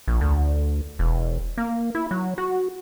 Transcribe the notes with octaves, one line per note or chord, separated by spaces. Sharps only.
A#1
D2
E1
A#3
E4
F#3
F#4